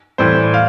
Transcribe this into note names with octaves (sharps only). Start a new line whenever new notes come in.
A2 E3 G3 C5
F5